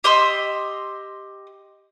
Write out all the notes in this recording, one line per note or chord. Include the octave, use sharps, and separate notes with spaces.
G4 D#5 C6 E6